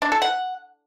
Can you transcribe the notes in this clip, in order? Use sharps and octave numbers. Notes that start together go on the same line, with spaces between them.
D4
A4
F#5